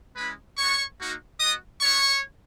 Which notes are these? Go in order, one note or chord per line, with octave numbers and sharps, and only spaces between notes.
G#3 C#4 E4 B4 B5
B3 F#4 C#5 C#6
A#3 D#4 F#4
B3 F#4 D#5 D#6
B3 E4 C#5 C#6